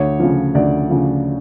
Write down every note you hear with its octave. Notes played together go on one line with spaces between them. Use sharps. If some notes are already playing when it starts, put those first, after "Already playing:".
Already playing: D2 C#5
C#3 F3
D2 D5
C#3 F3